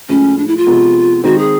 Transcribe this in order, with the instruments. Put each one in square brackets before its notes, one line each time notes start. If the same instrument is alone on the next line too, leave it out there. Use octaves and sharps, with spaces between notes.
[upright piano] A2 F3 G#3 [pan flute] C#4
[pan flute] D4
E4
F4
[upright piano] C3 F3 G#3 B3
[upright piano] D#3 G#3 C4 D#4 [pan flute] F#4
[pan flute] G#4